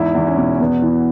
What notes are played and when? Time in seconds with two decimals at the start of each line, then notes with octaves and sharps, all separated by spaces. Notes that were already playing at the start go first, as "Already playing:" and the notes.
Already playing: E2 G#2 E4
0.15 E2
0.27 C#4
0.38 B2
0.60 E2 B3
0.82 E3